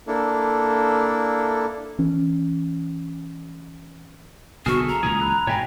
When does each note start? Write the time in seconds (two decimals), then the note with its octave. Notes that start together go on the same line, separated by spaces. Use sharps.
0.07 A#3 D4 E4 A4
1.99 E3 C#4
4.66 B1 D3 B3 F#4 G#4 A4 E5 F6
4.88 A#5
5.03 C#2 A#2 E3 G#4
5.21 B5 E6 F#6
5.47 G#2 B2 C#5 E5 G5 G#5 B5 A#6